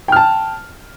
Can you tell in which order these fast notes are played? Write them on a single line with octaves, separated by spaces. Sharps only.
G5 F6 A5